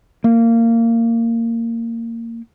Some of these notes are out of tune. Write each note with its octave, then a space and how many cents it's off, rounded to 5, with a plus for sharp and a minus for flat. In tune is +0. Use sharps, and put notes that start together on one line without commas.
A#3 -20